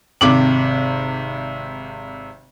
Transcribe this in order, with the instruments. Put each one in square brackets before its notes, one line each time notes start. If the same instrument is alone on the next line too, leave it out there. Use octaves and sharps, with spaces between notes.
[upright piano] G#1 C3 D6 F#7